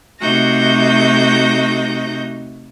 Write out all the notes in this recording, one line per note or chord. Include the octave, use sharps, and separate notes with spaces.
C3 A3 D#4 F#4 G6 A#6